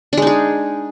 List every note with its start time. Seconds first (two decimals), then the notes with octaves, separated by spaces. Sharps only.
0.13 D4
0.17 G#3
0.22 D#4
0.27 G#4